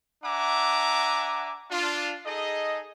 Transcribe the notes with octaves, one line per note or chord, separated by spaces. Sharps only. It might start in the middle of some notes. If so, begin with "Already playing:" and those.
D4 E5 F#5 G#5 A#5 D6
D4 F4
D#4 G#4 A4 D#5